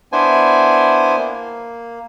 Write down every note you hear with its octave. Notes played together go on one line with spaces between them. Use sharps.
B3 D4 E4 C5 G#5
A#3